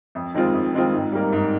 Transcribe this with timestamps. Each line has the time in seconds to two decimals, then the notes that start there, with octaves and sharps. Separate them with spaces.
0.15 F2
0.34 D#3 G#3 C4 F4
0.54 F2
0.74 D#3 G#3 C4 F4
0.94 G#2
1.12 G3 A#3 D#4
1.33 G#2